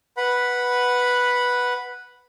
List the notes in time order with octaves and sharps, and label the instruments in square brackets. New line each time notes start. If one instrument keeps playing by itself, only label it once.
[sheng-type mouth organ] B4 F#5 B5